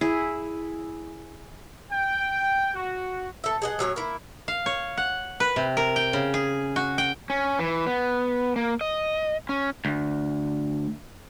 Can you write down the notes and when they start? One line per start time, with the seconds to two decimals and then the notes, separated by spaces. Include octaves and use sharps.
0.01 E4 G#4
1.91 G5
2.75 F#4
3.44 A4 E5
3.62 G#4 D#5 F#5
3.79 A2 F#3 C#5 G#5
3.96 A#3 E4
4.48 F5
4.66 C#5
4.97 F#5
5.40 B4
5.56 C3
5.77 A#4
5.96 G5
6.13 C#3
6.34 G#4
6.76 F#4
6.98 G5
7.30 C#4
7.59 E3
7.86 B3
8.56 A#3
8.81 D#5
9.49 C#4
9.85 D2